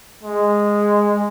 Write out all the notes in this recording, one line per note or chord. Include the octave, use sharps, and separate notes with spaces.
G#3